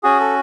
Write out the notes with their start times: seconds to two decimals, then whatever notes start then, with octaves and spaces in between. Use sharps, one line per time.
0.03 C#4 F#4 G#4
0.20 A4